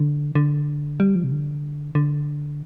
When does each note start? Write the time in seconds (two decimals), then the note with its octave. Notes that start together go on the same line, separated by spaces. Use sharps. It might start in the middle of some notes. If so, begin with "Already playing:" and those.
Already playing: D3
0.35 D3
1.00 G3
1.15 F3
1.24 C3
1.32 D3
1.95 D3